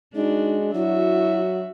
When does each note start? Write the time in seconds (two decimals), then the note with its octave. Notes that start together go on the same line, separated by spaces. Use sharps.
0.15 G#3 D4 D#4 F#4
0.75 F#3 E4 F#4 E5